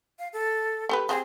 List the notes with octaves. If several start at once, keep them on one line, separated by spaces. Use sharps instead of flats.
F5
A4
A3 G4 B4
F3 C4 G4 G#4